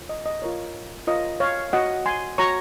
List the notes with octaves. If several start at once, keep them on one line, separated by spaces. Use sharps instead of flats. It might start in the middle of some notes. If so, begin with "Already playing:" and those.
Already playing: F4 A#4 C#5
D#5
D#5
F4 A#4 C#5
F4 A#4 C#5 D#5
C#5 F5
F#4 C#5 D#5 F#5
G#5 C6
F#4 C#5 A#5 C#6